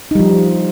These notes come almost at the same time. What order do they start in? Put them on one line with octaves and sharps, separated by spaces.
D#4 G3 F3